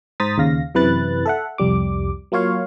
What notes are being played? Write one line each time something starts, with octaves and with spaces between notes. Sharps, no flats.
G#2 C5 A#5 D#6 A6 B6
D#2 C#3 F5 A#6
F#2 C3 E3 B4 F#6 A6
A4 E5 F#5
C2 F2 G3 D6
F#3 A#3 F4 C#5 F5